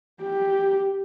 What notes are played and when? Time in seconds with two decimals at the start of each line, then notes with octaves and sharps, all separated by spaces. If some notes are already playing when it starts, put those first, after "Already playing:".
0.22 G4